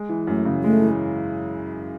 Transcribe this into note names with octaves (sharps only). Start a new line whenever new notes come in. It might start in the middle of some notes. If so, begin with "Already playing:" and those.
Already playing: G#3
E3
F#2 A3
C#3
G#3 A3
E3